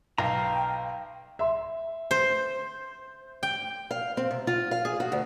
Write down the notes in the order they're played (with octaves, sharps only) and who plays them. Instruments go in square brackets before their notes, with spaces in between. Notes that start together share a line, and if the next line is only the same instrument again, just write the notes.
[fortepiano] B1 [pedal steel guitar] F5 A#5 [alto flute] G5
[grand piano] E5 C6
[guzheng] C5
G5
[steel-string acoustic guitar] F5
C4
C3
F4
F5
G#4
F#4
D2